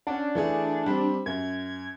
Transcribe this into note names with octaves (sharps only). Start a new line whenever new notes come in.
C#4 D4 F#5
E3 A3 G#4
G3 C4
F#2 G#6